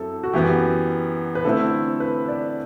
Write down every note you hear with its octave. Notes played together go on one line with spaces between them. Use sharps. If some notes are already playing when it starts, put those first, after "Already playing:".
Already playing: F#2 F#3 C4 E4 A4
F#4
F#2 E3 B3 G4
B4
D3 A3 C4 E4 A4
B4
D5